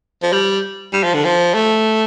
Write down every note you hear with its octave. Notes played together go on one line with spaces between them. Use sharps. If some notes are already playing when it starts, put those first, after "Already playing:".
F3
G3
G3
F3
D3
F3
A3